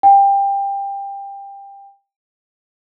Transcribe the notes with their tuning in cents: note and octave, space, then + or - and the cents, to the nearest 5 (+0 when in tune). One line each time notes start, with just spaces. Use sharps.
G5 +20